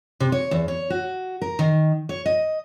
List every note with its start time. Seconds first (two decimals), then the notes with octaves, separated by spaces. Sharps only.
0.20 C3
0.32 C#5
0.51 E2
0.68 C#5
0.90 F#4
1.42 A#4
1.59 D#3
2.09 C#5
2.26 D#5